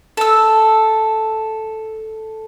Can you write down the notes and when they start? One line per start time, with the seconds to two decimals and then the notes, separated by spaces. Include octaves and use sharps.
0.17 A4 E6